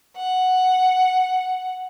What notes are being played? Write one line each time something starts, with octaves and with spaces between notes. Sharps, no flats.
F#5